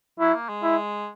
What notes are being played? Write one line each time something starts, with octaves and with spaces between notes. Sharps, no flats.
F#3 E4
A#3
G#3
E4